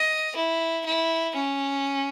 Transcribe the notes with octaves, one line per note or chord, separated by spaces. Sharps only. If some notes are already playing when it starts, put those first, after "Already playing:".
Already playing: D#5
E4
E4
C#4